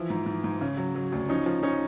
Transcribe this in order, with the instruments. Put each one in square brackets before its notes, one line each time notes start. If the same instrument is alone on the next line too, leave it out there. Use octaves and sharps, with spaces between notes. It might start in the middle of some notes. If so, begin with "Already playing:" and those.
Already playing: [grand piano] E3 F3
G#2
G#2
G#2
C#3
F#3
F#3
D2
F3 C#4 D#4
F3
F3 C#4 D#4